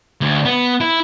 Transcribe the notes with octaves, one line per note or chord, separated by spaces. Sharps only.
D2
B3
E4